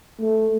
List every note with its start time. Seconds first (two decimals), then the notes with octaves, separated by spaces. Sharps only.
0.20 A3